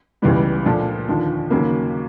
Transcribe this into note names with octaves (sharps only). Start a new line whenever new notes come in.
C#2 C#3 E3 G3 B3
A#2 F3 A3 D4
D#2 D3 F3
D#2 C#3 F#3 A#3